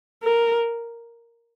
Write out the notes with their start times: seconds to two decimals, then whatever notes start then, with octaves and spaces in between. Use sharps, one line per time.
0.24 A#4